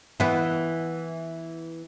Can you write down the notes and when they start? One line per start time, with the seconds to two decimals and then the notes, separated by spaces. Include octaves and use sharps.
0.20 E3 B3